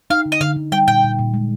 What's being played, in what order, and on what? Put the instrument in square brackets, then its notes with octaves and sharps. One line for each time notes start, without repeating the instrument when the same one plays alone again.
[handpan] D#4 [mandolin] F5
[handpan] D3
[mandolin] D#5
[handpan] D3 [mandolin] F5
[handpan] D3
[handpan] G3 [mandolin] G5
[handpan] A#2 [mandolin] G5
[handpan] A#2
A#2
G#3